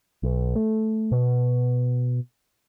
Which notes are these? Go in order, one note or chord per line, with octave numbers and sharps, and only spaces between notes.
B1
A3
B2